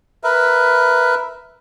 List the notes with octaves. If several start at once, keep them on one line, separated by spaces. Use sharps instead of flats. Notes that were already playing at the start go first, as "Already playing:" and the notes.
A#4 B4 E5